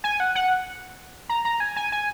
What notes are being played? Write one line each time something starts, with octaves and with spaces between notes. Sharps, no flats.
G#5
F#5
F#5
A#5
A#5
G#5
G#5
G#5